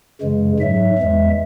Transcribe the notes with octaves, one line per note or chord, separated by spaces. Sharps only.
F#2 C#3 E3 G#3
G#2 F#3 E5
E2 E3 G#3